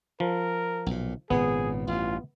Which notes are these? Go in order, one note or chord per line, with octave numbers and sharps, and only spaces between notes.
F3 A#4
B1 A#2
G#1 A#2 C#3 B3 G#4
A1 G2 F4